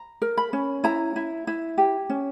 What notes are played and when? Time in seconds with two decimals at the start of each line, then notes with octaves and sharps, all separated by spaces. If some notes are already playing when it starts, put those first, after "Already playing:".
Already playing: A#5
0.22 A#4
0.37 B5
0.53 C#4
0.84 E4 A#5
1.16 E4
1.47 E4
1.78 G4
2.10 C#4